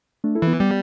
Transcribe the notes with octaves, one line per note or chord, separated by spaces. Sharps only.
A3 D4
E4 A4
E3
B3 E4
G3 B3